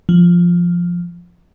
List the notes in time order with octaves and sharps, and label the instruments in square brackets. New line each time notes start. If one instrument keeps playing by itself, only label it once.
[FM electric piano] F3